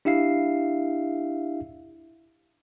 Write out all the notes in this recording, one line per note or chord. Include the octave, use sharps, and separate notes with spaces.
D4 E4 G4 E5 F5 C7